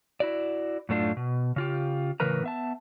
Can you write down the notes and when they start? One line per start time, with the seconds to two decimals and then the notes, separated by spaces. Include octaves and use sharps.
0.20 E4 F#4 D5
0.89 F#2 A2 A3 D4 F4
1.17 B2
1.56 C#3 F4 G4
2.20 A2 C#3 E3 A#4 B4 A#5
2.44 B3 E5 A5